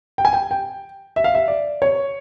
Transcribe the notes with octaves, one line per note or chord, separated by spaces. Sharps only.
G5
G#5
G5
G5
E5
F5
E5
D5
C#5